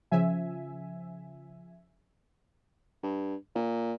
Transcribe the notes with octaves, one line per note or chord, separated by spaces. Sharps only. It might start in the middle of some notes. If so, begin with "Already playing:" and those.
C#3 F3 E5 G#5
G2
A#2